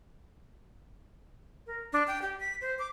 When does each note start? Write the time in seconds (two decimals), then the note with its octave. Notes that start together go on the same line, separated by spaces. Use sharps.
1.67 A#4
1.93 D4
2.07 G5
2.22 G4
2.40 B6
2.61 C5
2.79 D6